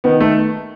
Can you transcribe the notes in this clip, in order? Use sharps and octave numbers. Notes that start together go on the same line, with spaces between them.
D#3 B3
A3